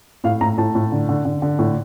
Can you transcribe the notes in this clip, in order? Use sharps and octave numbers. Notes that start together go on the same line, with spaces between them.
A2 F5
A2 A#5
A2 A5
A2
D3
D3
D3
D3
A2